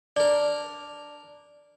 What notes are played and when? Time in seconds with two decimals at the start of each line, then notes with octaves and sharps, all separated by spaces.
0.16 D4 A#4 D5